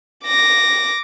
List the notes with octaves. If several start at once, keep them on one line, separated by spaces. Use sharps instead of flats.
D6 A#6